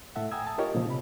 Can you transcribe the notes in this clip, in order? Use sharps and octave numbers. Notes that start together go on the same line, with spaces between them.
A2 A4 E5 F#5
G5 G#5 A#5 D#6 E6 G#6
A5
D#4 F4 G4 A#4 C#5 D#5
A#2 C#3 F3
C3 B5